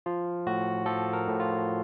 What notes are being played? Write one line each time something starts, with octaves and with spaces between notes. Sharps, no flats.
F3 F4
A2 F#4
F3 A4
A#4
A2
F4